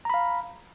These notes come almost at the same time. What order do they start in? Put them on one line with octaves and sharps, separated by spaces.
A#5 B5 F5